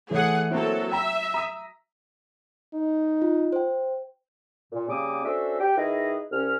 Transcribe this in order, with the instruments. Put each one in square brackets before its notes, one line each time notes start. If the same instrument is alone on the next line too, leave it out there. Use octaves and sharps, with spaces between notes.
[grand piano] E3 A3 C#5 [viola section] G#4 F#5
[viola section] F#3 A4 [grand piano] A#3 C4 E4
[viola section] E5 [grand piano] G5 A#5
[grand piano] A#5 D#6 B6
[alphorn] D#4
[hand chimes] F4
C5 G5
[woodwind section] A#2
C#3 G3 A#3 C4 D6 D#6
C#4 D4 F#4 A4 C5 E5
G4 G5
D#3 E4 G#4 B4 D#5
C2 C#4 F6